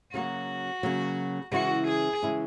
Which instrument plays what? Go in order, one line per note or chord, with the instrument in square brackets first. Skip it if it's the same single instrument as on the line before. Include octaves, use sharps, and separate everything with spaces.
[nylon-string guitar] C#3 F#3 A#3 [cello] F#4
[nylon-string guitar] C#3 F#3 A#3
[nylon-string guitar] C#3 E3 G#3 C#4 E4 [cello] F#4
[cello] G#4
[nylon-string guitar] C#3 E3 G#3 C#4 E4